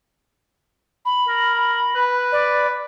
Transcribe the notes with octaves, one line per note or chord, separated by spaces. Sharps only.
B5
A#4
B4
D5